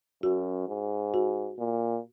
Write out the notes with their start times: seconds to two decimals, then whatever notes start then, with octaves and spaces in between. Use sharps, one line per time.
0.23 F#2 F#4
0.68 G#2
1.14 F#4
1.59 A#2